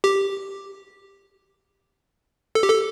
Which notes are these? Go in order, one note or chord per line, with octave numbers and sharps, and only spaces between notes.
G4
A4
G4
A4